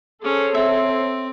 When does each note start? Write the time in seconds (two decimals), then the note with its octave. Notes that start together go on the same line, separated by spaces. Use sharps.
0.22 C#4 G#4 A4 C5 C#5
0.54 C4 E5